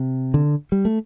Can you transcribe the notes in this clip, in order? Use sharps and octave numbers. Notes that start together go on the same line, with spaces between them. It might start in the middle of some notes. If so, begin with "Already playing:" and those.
Already playing: C3
D3
G3
A3